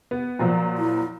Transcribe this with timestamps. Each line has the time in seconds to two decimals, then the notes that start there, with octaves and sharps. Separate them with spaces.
0.11 B3
0.39 A#2 F3 F#3
0.78 E4